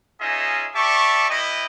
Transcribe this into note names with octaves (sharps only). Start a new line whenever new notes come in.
C#4 D#4 F4 G#4 D#5 E5
G4 D5 E5 A5 C#6
E4 G4 B4 D#5